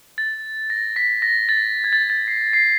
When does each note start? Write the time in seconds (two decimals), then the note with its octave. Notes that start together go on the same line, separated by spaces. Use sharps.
0.18 A6
0.70 A#6
0.96 B6
1.22 A#6
1.49 A6
1.84 G#6
1.93 A6
2.10 A6
2.28 C7
2.53 C7